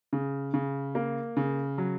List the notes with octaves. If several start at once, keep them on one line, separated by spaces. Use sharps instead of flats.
C#3
C#3
A#3
C#3
F#3